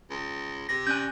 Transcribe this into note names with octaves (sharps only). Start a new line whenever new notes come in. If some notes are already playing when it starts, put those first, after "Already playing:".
C#2
C3 A#6
C#4 D5 G#5 F#6 G6